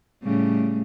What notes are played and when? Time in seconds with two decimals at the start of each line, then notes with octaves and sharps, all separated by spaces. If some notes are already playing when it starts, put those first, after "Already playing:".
0.23 A2 C#3 G3